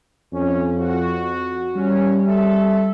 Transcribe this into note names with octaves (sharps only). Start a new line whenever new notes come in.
F2 C#4
F#4
G3 C#4
A4 E5